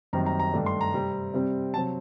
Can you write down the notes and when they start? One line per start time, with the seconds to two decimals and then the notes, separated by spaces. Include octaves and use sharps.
0.13 F#2 D#3 G3 C4 A#5
0.26 A#5
0.40 A#5
0.53 G2 D#3 A3 D4
0.66 C6
0.81 A#5
0.94 C3 G3 C4
1.34 C3 G3 C4
1.74 C3 F#3 C4 A5